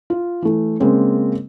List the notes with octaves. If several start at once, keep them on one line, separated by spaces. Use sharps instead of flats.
F4
E3 A3
C#3 G#3 A#3 C4 C#4